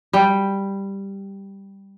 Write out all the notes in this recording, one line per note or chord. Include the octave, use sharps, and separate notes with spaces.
G3 G5